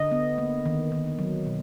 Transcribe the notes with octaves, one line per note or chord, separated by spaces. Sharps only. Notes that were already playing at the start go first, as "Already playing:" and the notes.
Already playing: D3 D#5
B3
A#3
D#3
D#3
F#3
B2